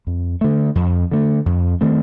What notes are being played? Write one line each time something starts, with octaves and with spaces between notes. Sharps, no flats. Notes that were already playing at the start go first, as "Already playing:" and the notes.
F2
D3 A3
F2
D3 A3
F2
D#3 A3 C4